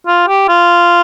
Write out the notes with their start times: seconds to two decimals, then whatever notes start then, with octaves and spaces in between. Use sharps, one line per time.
0.07 F4
0.28 G4
0.48 F4